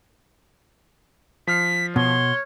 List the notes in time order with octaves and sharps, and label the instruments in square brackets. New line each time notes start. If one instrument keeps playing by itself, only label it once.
[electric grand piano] F3 F6 C7 [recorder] B6
[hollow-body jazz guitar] B2 [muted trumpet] C#5 [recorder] C6